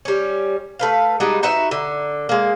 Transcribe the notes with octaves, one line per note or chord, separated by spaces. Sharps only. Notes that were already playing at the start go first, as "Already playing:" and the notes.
G3 C#4
A3 B4 F5
G3 G#3 D#4 F#4
D#4 F#4 B4 E5
D3
G#3 A#3